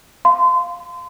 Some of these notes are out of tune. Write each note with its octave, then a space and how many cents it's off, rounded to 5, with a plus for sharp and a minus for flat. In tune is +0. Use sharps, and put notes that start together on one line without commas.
F5 +0 C6 -30